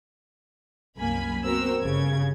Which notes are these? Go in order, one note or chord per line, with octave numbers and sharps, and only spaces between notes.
C2 F#2 A#3 G#5 B5
B3 C4 F#4 A#4 C5 E6
G1 C#3 G#6